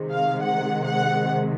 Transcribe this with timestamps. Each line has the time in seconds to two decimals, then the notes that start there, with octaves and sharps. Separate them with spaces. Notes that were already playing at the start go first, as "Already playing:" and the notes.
Already playing: C3 D#3 G#3
0.11 F5
0.41 F#5
0.84 F#5